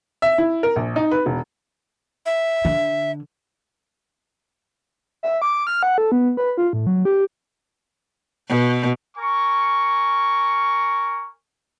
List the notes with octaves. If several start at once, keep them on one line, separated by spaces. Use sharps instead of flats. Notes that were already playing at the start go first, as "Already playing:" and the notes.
E5
E4
A#4
A#1
D#4
B4
E1
E5
D3
E5
D6
F6
F#5
A4
B3
B4
F4
A2
F#3
G4
B2
A#4 G#5 C#6